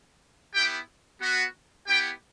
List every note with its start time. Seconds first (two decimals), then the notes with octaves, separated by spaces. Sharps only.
0.53 B3 E4 G4 G5
1.19 B3 F#4
1.87 B3 E4 G4 G5